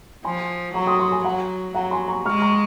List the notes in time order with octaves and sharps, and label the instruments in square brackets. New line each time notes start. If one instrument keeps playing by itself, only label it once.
[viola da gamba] F3 [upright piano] G#5 C6
[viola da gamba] F#3 [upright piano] A#5 C#6
[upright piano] C6 D#6
C6 D#6
G#5 C6
[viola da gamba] F#3 [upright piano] F#5 A#5
[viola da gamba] F#3 [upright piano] F#5 A#5
[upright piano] G#5 C6
A#5 C#6
[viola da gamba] G#3 [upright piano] C#6 F6
[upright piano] A#5 C#6